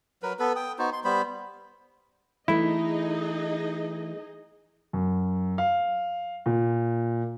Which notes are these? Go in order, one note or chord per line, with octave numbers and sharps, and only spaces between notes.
F#3 A#4 B4
B3 A4 B4
G5 D#6
B3 D#4 F#4 C5
C6
G3 B3 C5 B5
E3 A3 D#4 E4 G#4 D#5
F#2
F5
A#2